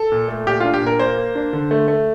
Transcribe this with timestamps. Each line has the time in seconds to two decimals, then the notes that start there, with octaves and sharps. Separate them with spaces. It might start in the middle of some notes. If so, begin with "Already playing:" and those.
Already playing: A4
0.12 A#2
0.28 A3
0.47 A#2 G4
0.60 D4 F4
0.74 G4
0.82 A#2 A#4
0.99 A#3 C5
1.18 A#3
1.35 D4
1.53 D3
1.71 A3
1.88 A3